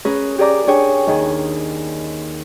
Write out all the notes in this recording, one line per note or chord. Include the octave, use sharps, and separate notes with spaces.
C#4 G#4 A#4 B4
G4 G#4 A#4 D5 A#5 D6
D4 G4 G#4 C#5 G5 G#5
D#2 D#3 G#4